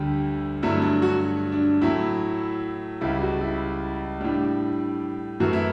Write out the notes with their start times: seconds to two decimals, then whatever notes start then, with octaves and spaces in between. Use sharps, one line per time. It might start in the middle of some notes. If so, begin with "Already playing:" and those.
Already playing: D2 D3 G3 G4
0.63 G2 D3 F#3 A3 E4
0.82 D4
1.02 F#4
1.52 D4
1.81 A2 F#3 A3 E4
3.01 C#2 C#3 G3 E4
3.22 F#4
3.41 E4
4.21 A2 G3 D4
5.40 F#2 E3 A3 F#4
5.53 E4